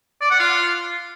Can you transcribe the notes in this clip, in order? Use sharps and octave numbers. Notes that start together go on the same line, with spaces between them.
D5
F#5
F4